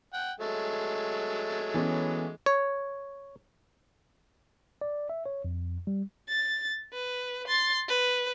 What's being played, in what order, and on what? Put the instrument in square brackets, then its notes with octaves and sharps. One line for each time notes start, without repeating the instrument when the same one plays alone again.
[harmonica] F#5 G5
F#3 G#3 A3
[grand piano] E3 B3 C#4
[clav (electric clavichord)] C#5
[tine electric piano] D5
E5
C#5
F2
G3
[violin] A6
B4
C6 A6
B4